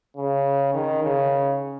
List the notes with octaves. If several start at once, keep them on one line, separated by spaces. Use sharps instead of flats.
C#3
D#3
C#3